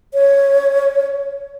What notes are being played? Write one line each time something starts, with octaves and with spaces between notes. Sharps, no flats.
C#5